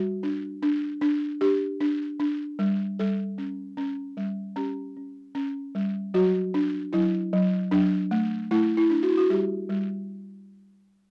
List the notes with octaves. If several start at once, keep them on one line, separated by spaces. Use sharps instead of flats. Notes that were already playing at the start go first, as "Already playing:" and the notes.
Already playing: G3 F#4
D4
D4
D4
D4 G4
D4
D4
G3
G3 A4
C#4
C#4
G3
C#4 G4
C#4
C#4
G3
F#3 F#4
D4
F#3 E4
F#3
F#3 D4
A3
A3 E4
E4
D4
F#4
E4
F#4
G3 G4
G3